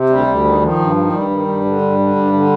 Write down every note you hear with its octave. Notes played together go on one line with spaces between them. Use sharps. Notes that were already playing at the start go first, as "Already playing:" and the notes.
Already playing: C3
D2 G3
D2
D#3
D#3 F3
G2
D#3
G2 G3
D#3
G2
D3
G2
D3
G2
D3